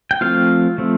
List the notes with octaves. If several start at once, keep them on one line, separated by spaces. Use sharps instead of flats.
G5
F3 A3 C4 F4 F5
F3 A3 C4